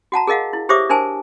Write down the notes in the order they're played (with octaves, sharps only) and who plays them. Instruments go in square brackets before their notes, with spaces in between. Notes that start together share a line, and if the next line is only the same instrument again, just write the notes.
[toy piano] F#4 F#5 A5 A#5
G#4 A#4 D#5 F5 F#5
E4
G4 C5 C#5 E5 D6 D#6
D4 A#4 C5 G#5 A5